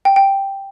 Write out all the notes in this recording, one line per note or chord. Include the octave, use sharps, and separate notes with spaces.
G5
G5